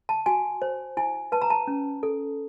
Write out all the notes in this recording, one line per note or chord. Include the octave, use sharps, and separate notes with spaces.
A5
F#4 G#5
C5
E4 G#5
B4 A5
A#5
A5
C#4
A4